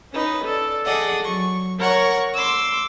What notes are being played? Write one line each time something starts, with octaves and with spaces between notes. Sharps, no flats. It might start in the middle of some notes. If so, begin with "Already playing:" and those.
C#4 D#4 B4
A4 D5
G#4 A4 D5 D#5 F#5
F#3 C#6
A#4 C#5 F#5 C#6
C6 D6 E6